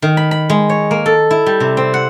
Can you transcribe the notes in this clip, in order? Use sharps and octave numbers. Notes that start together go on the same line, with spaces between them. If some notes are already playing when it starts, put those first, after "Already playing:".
D#3
B5
B5
G#3
C#5
A#3
A4
E4
G3
C3
C4
F#5